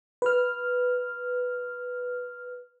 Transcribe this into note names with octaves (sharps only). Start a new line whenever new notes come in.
B4 F6